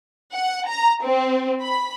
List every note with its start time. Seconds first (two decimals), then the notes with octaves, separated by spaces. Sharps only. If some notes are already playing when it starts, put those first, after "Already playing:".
0.33 F#5
0.67 A#5
1.03 C4
1.61 B5